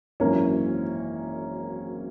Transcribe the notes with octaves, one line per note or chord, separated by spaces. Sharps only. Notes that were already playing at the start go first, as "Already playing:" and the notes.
G#1 F#2 E3 A#3 C#4